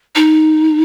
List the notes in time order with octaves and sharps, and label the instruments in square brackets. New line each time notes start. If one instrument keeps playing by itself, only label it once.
[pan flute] D#4